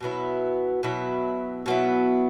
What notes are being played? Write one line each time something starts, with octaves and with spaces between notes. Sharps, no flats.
B2 F#3 B3 E4
B2 F#3 B3 E4
B2 F#3 B3 E4